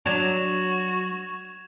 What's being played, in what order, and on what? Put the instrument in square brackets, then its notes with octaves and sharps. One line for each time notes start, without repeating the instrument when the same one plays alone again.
[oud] F#3 D4 [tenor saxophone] F#4 [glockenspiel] G#6 E7 F7